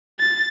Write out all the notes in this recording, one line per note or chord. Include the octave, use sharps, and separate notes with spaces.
A6